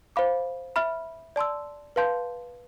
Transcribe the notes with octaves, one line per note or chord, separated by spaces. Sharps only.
C5 F5 B5 D6
E5 B5 F6
D5 A5 C6 E6
B4 F5 A5 C6 G6